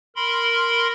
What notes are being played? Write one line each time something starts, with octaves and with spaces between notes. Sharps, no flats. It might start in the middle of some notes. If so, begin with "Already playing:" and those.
A#4 B5 C6